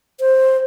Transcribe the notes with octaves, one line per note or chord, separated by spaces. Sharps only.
C5